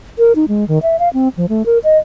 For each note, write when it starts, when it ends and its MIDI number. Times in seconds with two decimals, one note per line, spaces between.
0.18 0.33 70
0.35 0.45 63
0.48 0.67 56
0.68 0.79 51
0.83 0.99 76
0.99 1.09 77
1.14 1.29 60
1.37 1.46 53
1.49 1.65 57
1.66 1.78 70
1.84 1.98 75